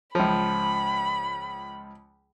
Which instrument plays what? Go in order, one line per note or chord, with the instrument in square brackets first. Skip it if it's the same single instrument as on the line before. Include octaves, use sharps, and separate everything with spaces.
[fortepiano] C#2 F3 [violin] B5